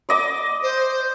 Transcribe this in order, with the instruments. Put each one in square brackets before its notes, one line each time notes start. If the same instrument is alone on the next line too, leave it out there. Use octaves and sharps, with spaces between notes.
[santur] D5 D#5 D6
[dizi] C5